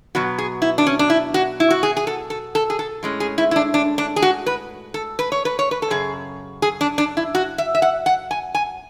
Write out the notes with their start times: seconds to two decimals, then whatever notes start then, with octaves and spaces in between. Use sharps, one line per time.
0.15 B2 F#3 B3 F#4
0.38 G#4
0.62 E4
0.78 D4
0.87 C#4
0.99 D4
1.10 E4
1.34 F#4
1.60 E4
1.70 F#4
1.83 G#4
1.97 G#4
2.07 A4
2.30 A4
2.55 A4
2.70 G#4
2.79 A4
3.03 A2 G#3 C#4
3.20 G#4
3.38 E4
3.51 E4
3.56 D4
3.74 D4
3.98 D4
4.16 G#4
4.22 F#4
4.46 B4
4.94 A4
5.19 B4
5.32 C#5
5.45 B4
5.59 C#5
5.71 B4
5.82 A4
5.90 F#2 C#3 G#4
6.62 G#4
6.81 D4
6.98 D4
7.17 E4
7.35 F#4
7.58 E5
7.75 E5
7.82 F#5
8.06 F#5
8.31 G#5
8.55 G#5